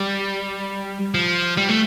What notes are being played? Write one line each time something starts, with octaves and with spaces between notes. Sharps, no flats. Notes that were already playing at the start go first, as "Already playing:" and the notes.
Already playing: G3
F3
G3
A3